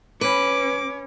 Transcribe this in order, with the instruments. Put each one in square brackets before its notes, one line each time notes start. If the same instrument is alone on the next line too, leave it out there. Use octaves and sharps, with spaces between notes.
[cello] C#4 [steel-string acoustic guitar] B4 [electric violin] D6